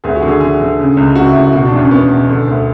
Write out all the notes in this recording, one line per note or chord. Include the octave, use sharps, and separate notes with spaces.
D2 G#4
F#4
D3
G#4
D3 G#4
D3
C#3
C#2
C#2 F#4
E4
C#2
E4
B2 F#4
D4
E2
C#4
E2 B3
B2
D3
D2